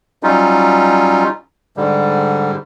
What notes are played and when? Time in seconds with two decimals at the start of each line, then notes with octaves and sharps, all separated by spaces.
0.23 F#3 G3 C#4 D#4 F4
1.77 G#2 D3 G3